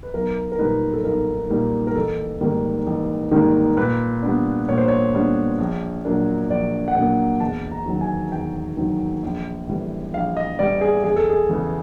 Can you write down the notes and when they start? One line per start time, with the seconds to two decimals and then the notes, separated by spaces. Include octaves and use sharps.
0.03 B4
0.14 B1 A#4
0.52 A#4
0.59 A#2 G3 A#3 D#4 B4
0.93 A4
1.04 B1 A#4
1.50 A#2 G3 A#3 D#4
1.87 A#4
1.96 A1 A4
2.41 G#2 D#3 G3 A#3
2.86 A1
3.31 G#2 D#3 G3 A#3
3.77 A#2 B4
4.23 G3 B3 D4
4.69 A#2 C#5
4.78 C5
4.88 C#5
5.14 G3 B3 D4
5.58 A#1
6.05 A#2 F#3 A#3 D4
6.50 A#1 D5
6.88 F#5
6.95 A#2 F#3 A#3 D4 G5
7.40 E1 A5
7.71 A#5
7.86 D#2 D#3 F#3
8.01 G#5
8.32 E1 G5
8.77 D#2 D#3 F#3
9.23 A#1
9.67 A2 E3 G3
10.14 A#1 F5
10.37 D#5
10.59 A2 E3 G3 D5
10.81 G#4
11.04 E1 G#4
11.16 A4
11.30 G#4
11.49 E2 C#3 E3